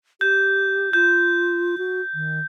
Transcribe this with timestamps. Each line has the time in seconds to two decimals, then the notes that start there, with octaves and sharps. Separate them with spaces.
0.21 G4 G6
0.93 F4 G6
1.78 F#4
2.14 D#3